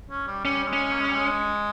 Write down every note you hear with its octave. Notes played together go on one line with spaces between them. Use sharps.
C#4
G3
G3 C#4
G#3
C#4
A#3
G#3
G3
G#3